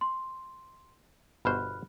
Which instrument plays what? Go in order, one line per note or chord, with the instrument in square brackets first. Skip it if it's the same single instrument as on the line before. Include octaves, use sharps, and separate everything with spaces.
[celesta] C6
[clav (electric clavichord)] G1 B2 C5 [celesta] B5 F6 F#6